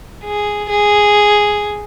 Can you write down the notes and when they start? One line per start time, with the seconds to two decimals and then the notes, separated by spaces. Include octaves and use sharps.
0.24 G#4
0.69 G#4